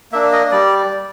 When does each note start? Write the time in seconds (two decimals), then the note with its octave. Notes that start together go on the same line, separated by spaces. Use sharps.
0.12 A#3 D4 E5
0.32 D#5
0.51 G3 D5